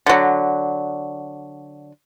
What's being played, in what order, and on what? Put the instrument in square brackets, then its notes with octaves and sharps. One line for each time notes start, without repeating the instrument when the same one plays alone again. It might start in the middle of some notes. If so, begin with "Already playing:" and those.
[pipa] D3 F#3